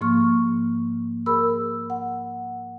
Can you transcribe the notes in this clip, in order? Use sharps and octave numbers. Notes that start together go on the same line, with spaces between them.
G#2 F3 A#3 C#6 F6
G#4 A#4 B5 E6
F#5